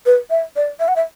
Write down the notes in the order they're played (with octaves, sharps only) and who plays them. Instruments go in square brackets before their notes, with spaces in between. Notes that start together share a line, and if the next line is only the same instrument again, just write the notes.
[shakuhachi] B4
E5
D5
E5
F#5
E5